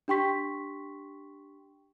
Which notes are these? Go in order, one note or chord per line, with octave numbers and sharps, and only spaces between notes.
D4 G4 G5 C6 C#6 B6